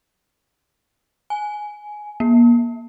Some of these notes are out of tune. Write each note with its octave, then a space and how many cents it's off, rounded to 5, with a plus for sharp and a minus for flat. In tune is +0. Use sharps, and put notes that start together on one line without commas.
G#5 +10
A#3 +35